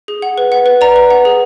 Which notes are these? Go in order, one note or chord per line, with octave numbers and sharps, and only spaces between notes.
G#4
F#5
B4
F#5
B4
D5 A#5
B4
F#5
G#4